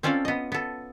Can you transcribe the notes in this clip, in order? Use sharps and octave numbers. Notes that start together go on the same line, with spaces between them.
C4 C#4 F4 A4 D5 F5
B3 D#5
B3 A4